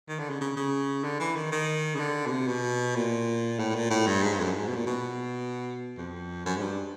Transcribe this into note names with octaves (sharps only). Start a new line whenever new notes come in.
D#3
D3
C#3
C#3
C#3
D3
E3
D#3
D#3
C#3
D3
B2
C3
B2
A#2
A2
A#2
A2
G2
G#2
G2
F2
F#2
G#2
B2
A#2
B2
F2
F#2
G#2
G2